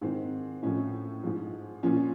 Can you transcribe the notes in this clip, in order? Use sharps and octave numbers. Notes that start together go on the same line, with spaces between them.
G#2 D#3 C4
A2 F3 C#4
G#2 F3
A#2 F3 C#4